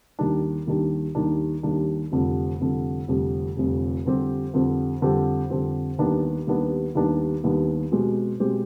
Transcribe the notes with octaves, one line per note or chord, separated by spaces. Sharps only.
D#2 D#3 G3 D4
D#2 D#3 G3 D4
D#2 D#3 G3 D4
D#2 D#3 G3 D4
F1 F2 D3 G3
F1 F2 D3 G3
F1 F2 D3 G3
F1 F2 D3 G3
F2 D3 G3 C4 G4
F2 D3 G3 C4 G4
F2 D3 G3 C4 G4
F2 D3 G3 C4 G4
D#2 D#3 G3 B3 D4
D#2 D#3 G3 B3 D4
D#2 D#3 G3 B3 D4
D#2 D#3 G3 B3 D4
B2 G#3 C4 G4
B2 G#3 C4 G4